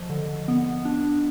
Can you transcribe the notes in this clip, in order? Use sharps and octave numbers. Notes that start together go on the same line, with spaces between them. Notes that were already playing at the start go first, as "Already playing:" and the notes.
Already playing: F3 D#5
D3
B3
D4